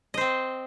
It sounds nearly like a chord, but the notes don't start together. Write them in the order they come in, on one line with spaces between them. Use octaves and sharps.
D#5 C5 C4